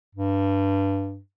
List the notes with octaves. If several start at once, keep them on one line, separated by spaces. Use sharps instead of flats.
G2